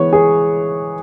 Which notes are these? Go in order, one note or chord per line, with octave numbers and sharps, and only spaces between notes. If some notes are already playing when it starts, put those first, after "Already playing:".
Already playing: E3 G#3 B3 C#5
G#4